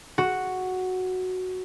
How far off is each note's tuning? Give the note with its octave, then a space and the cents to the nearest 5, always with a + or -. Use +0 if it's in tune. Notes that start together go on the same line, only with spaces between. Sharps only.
F#4 +0